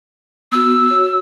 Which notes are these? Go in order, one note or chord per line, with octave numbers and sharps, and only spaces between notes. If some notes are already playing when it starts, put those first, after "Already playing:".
B3 F#4 E6
F#4 C#5